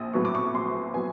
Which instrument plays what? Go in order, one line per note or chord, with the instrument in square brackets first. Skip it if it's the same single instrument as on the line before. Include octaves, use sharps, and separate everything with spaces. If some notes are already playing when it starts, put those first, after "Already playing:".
Already playing: [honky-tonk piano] A#1 D#6
A2 F#3 B3 C#6
D6
C#6
A#1 C6
F#3 B3 G#5